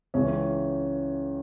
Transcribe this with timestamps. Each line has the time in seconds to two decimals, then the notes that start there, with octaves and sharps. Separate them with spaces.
0.14 C#2 C#3 E3 C#4